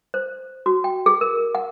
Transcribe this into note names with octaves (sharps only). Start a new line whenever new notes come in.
C5
F#4
G5
G#4
A#4
F#5